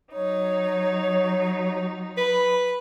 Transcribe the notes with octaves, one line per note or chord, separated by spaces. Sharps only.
F#3 D#4 C#5
B4 B5